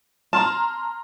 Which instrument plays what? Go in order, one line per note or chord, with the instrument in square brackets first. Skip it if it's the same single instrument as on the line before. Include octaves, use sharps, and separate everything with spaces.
[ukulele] A5 [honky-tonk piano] A#5 C6 F6